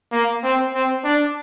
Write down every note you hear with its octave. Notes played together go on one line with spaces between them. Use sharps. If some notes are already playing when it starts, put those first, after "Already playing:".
A#3
C4
C4
D4